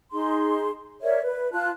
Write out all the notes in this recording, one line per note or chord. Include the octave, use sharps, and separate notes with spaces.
D#4 G#4 C6
A#4 C#5 D5 E5
B4
F4 A5 F#6